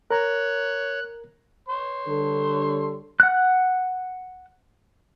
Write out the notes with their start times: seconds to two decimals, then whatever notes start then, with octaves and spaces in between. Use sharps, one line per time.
0.11 A#4 C#5 A#5 F#6
1.68 C#5 C6
2.07 D3 G3 A4
3.20 F#5 F#6